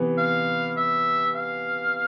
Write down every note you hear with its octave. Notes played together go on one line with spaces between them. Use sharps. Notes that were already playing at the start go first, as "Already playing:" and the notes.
Already playing: C3 E3 B3
F5
E5
F5